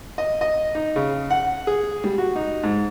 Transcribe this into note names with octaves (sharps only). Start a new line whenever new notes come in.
D#5
D#5
D#4
C#3
F#5
G#4
G3
F#4
D#4
G#2